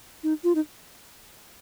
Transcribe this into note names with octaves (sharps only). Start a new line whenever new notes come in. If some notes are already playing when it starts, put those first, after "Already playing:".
D#4
F4
D#4